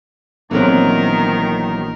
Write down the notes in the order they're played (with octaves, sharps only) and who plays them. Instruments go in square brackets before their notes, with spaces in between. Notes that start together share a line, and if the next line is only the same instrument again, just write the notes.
[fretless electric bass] A#1 B3 [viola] D#3 [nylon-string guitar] E3 F#3 C4 [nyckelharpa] A#4